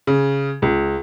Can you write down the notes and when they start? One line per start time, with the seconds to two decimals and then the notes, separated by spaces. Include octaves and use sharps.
0.07 C#3
0.62 C#2